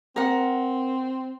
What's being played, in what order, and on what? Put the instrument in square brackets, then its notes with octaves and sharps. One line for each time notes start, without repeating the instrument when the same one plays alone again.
[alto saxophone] C4 [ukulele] A#4 F#5